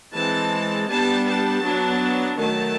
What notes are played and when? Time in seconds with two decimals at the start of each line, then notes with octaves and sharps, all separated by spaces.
0.14 E3 G#3 C4 A5
0.90 G3 B3 D4 A5
1.27 A5
1.64 F#3 B3 D4
2.39 D#3 F#3 A3 A5